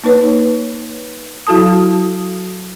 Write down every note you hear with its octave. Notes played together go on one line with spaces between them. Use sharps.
A#3 D#4 B4 C#5
F#3 E4 F#4 A4 A5 D#6